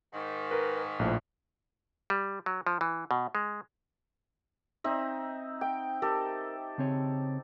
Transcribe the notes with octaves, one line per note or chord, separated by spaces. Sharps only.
G#2 D#3
A#4 B4
A#1 A2 F3
G3
F#3
F3
E3
B2
G#3
C4 D#4 E5
G5
G4 A4 A#4
C#3 C4 C#5